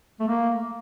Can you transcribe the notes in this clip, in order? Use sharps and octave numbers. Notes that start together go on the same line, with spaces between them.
A3
A#3